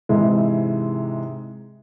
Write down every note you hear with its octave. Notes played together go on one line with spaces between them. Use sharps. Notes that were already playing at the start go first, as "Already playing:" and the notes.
G#2 C3 E3 G#3